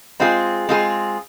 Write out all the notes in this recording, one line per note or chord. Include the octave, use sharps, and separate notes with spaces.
G#3 C4 F4 G#4
G#3 C4 F4 G#4